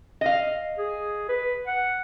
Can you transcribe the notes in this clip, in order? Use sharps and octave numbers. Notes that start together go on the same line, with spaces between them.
D#5 F5
G#4
B4
F#5